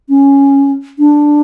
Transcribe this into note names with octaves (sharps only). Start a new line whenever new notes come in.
C#4
D4